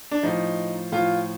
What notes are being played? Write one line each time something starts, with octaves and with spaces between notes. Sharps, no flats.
D4
A2 F3 D#4
A2 F3 F4